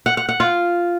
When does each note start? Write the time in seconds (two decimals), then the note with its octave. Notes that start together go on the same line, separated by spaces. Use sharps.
0.06 F#5
0.17 F#5
0.29 F#5
0.40 F4